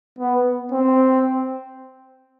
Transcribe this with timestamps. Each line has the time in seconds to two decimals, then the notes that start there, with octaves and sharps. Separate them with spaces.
0.19 B3
0.72 C4